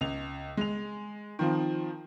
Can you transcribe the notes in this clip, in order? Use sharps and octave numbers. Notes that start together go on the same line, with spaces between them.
C#2 F7
G#3 F7
D#3 F3 C4